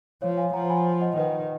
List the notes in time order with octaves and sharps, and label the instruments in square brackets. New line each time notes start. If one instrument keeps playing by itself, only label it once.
[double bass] F3 [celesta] C#5 F5
[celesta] F5 G#5
[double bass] F3 [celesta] F#5 A#5
[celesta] G#5 B5
D#5 F#5
[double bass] D#3 [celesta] B4 D#5